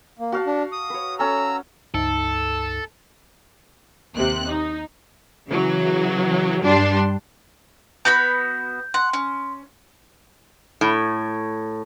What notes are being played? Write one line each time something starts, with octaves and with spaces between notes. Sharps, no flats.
A#3
F#4 F5 A5
D4
D#6
B4 C#5
C#4 A4 A#5 E6
C#2 G2 D#4 A4
D#2 C3 F#6
D#4
C#3 E3 F#3
G2 G3 D4 C6
B3 F#4 B5 G6
F#5 C6
C#4
A2